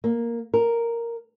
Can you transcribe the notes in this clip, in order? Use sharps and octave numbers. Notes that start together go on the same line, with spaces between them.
A#3
A#4